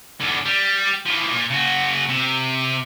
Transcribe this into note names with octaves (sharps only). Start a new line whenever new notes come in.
E2 D3
G3
E3 F3
A#2
C#3 F#4
C3